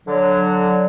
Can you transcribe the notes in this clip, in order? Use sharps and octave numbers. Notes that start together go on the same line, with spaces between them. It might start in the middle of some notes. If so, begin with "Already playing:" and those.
D3 F#3